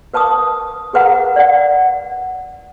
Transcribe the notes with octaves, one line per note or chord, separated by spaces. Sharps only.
A#4 B4 A5 D6 D#6
G#4 A#4 B4 F#5 A#5
D5 F#5